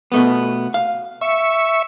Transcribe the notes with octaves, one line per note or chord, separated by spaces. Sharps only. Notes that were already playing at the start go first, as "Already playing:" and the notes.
B2 A3 B3
F5
E5 C#6